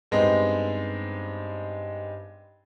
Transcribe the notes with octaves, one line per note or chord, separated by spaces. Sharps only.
G2 G#3 B3 C4 D#4